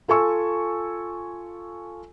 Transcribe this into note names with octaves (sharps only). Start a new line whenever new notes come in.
F4 A4 G#5 C#6 E6